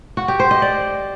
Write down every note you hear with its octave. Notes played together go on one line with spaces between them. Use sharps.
F#4
G4
C5
D#5
D5